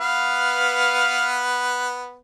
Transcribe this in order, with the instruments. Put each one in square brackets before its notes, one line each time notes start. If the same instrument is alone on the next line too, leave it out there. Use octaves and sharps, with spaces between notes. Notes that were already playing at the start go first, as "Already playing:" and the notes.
[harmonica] B3 B4 [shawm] F5